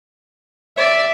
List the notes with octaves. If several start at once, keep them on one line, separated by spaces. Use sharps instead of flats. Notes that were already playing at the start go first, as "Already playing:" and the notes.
D5 E5